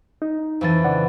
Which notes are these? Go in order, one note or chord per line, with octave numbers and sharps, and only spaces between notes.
D#4
F2 E3 A6
C#3 D5 F#5